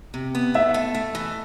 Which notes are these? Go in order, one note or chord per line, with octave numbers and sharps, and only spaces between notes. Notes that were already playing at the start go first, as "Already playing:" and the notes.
C3
B3
A3 E5
A4
A3
E3